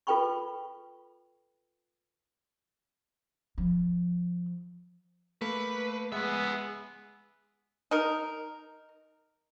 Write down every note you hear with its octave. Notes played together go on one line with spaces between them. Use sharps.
F4 A4 B4 G5 B5 C#6
F3
A3 A#3 B4
G#3 B3 G#4 E5
D#4 A#4